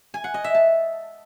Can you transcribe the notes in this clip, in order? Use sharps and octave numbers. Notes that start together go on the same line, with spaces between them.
G#5
F#5
D#5
E5
A5